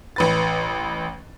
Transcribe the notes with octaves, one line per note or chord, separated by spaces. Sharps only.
A1 B4 A6